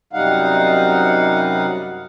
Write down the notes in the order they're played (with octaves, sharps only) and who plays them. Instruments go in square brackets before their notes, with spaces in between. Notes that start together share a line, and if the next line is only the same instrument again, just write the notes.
[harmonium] F#2 C3 G3 D#4 F5 F#5